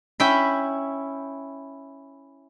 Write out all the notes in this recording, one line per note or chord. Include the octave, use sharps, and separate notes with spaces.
C#4 E4 G5 B5